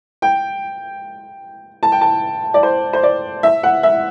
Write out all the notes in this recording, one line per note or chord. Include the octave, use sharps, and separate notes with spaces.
G5
A5
G5
A5
D5
C5
C5
D5
E5
F#5
E5